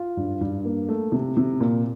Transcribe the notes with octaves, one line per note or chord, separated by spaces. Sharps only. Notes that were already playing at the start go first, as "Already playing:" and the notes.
Already playing: F4
G2
G2
A#3
A3
C3
C3
A#2